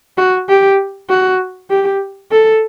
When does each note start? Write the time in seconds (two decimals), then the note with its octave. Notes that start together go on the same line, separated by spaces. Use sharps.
0.17 F#4
0.49 G4
1.09 F#4
1.70 G4
2.31 A4